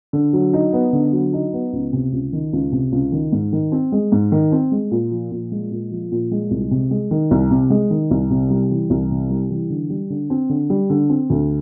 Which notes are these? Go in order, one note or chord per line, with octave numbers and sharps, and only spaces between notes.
D3
F#3
D#4
B3
D3
F#3
D#4
B3
C#2
C3
C#2
D#3
C#2
C3
C#2
D#3
G#2
D#3
C4
G#3
G#2
D#3
C4
G#3
A#2
F3
A#2
G#3
A#2
F3
A#2
G#3
C2
C3
G#3
D#3
C2
C3
G#3
D#3
C2
C3
G3
E3
C2
C3
G3
E3
D3
G3
D3
C4
D3
G3
D3
C4
D2